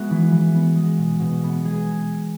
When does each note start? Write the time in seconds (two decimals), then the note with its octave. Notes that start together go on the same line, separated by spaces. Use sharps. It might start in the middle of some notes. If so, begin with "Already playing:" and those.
Already playing: G#3 B3 F#4 E5
0.10 E3
0.32 E3
0.54 B3
0.76 G#3
0.98 B2
1.20 B2
1.43 B3
1.65 G#3 G#4